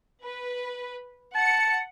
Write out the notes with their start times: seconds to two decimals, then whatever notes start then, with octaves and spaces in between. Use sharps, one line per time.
0.23 B4
1.35 F#5 A5 C#7